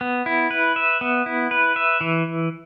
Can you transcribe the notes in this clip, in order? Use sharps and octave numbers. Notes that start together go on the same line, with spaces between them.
B3
E4
B4
E5
B3
E4
B4
E5
E3